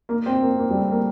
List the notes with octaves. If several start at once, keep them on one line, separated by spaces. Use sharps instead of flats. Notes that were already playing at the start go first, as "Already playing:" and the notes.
A#3
C4
A#3
A#3
G3
A3
A#3